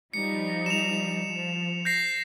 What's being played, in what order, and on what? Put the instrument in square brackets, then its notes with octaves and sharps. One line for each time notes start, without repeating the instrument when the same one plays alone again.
[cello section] F3 G3 D#4 [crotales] C#7
[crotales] E7 F7
[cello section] F3
[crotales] G6 A#6 C7